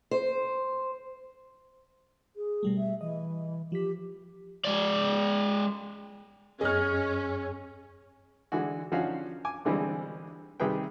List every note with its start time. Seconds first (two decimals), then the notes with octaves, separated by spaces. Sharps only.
0.11 C5
2.36 G#4
2.63 B2 G3 A3
2.78 E5
3.01 E3 D#5
3.72 F3 G4 B6
4.65 G#3 D5
6.61 F#2 C#4 G#4 D#5 F6
8.52 D3 E3 G#3 F#4
8.92 D3 F3 C#4 D#4 F#4 F5
9.45 G#5 D6
9.65 B2 D3 E3 G3 G#3 C4
10.60 C3 D#3 G3 G#4 B4 G5